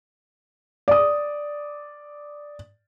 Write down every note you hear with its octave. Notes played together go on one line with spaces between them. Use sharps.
D5 D#6